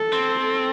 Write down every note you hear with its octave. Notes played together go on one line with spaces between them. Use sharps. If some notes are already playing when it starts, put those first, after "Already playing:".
Already playing: A4
C4
A4